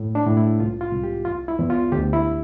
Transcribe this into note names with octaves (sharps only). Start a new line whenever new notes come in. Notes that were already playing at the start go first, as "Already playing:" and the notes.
Already playing: A2
D4
A2
E4
C2 F4
F4
C2
G4
E2 F4
E4
E2
F4
D2 G4
E4